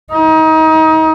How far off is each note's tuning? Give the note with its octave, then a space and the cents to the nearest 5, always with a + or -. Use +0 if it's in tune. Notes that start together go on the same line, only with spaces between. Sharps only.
D#4 +30